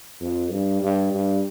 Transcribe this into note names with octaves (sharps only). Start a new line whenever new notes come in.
F2
G2
G2
G2